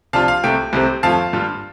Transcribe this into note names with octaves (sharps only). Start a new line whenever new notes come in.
C3 F3 D4 F4 F5 A5
F5
C2 C3 A3 G5
C2 C3 A3 C4
F2 F3 A3 F4 F5 A5
G2 G3 F4